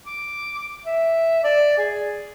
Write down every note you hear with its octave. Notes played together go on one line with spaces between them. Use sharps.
D6
E5
D5
G#4